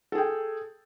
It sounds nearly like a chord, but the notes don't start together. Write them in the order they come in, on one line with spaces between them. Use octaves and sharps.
A4 G#4 G5